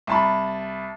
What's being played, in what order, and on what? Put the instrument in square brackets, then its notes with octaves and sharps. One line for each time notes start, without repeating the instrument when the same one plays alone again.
[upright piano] C2 A5 B5